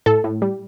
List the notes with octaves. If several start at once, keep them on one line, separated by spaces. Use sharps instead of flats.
A2 A4
A2
G3